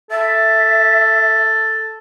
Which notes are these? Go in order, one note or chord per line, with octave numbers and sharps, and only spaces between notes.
A4 E5